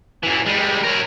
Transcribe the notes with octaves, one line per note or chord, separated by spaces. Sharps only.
F#2 E3
G3 G#3
A#4 C#5